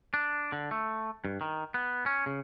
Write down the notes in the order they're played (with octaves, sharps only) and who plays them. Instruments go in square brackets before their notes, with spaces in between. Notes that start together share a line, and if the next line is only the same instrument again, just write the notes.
[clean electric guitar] D4
D3
A3
G2
D#3
B3
C#4
C#3